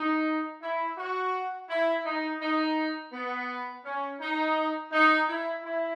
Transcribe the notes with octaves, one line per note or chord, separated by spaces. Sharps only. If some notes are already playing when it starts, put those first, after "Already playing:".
Already playing: D#4
E4
F#4
E4
D#4
D#4
B3
C#4
D#4
D#4
E4
E4